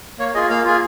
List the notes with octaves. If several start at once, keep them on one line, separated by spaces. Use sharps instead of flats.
A#3 C#5
F4 G#4 D#5
A#3 F5
F4 G#4